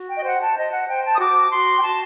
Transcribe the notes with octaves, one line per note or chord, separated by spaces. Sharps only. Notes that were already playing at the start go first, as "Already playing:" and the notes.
Already playing: F#4
G5
D#5
C5 F#5
A5
C5 D#5
F#5
C5 G5
A5
D#6
F#4 D6
F#4 C6
G5
F#4 A5